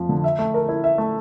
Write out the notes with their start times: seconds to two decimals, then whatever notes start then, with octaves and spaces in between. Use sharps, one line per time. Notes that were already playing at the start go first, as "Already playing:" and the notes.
Already playing: F2 F3
0.09 D3
0.24 E5
0.39 A3
0.54 A#4
0.69 E4
0.84 E5
0.98 A3